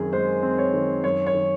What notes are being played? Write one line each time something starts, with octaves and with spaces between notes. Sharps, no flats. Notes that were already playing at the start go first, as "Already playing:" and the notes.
Already playing: F#2 D#3 C4 G#4
G#3 C5
C4
C#5
D#3
F#2 C#5
C#5
D#3